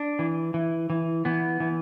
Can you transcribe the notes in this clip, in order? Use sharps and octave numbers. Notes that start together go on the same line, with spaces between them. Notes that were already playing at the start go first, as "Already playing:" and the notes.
Already playing: D4
E3
E3
E3
E3 B3
E3